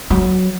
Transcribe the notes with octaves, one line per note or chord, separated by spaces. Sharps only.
F#3